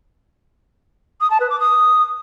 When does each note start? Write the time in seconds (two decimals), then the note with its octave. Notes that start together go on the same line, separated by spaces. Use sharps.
1.21 D#6
1.30 A5
1.40 B4
1.50 D6
1.60 D#6